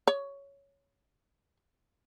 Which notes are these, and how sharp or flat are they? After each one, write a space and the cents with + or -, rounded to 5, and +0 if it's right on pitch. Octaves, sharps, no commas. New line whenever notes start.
C#5 +10